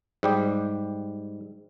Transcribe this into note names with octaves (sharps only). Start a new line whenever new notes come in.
G#2 G3 G4